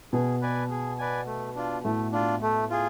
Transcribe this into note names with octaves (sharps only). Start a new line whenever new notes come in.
B2 G#4
B4 D5 G#5
G#4
B4 D5 G#5
A3
D4 F4
A2 A3
D4 F4
A3
F4 G#4